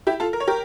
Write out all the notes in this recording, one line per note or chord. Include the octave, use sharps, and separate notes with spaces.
E4 G4
F4 A4
A#4
C#5
G4 A#4